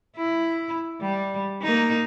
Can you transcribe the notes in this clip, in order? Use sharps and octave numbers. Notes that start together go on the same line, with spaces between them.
E4
G3
A#3 D#4